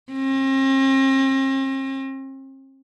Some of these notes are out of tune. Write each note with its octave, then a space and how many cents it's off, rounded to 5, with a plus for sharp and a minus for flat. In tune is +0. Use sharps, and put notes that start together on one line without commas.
C4 +45